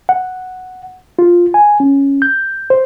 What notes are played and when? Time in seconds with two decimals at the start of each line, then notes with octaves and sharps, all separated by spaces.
0.09 F#5
1.19 F4
1.54 G#5
1.80 C#4
2.22 G6
2.70 C5